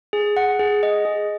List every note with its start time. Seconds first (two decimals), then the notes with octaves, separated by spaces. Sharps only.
0.13 G#4
0.37 F#5
0.59 G#4
0.83 D#5
1.05 G#4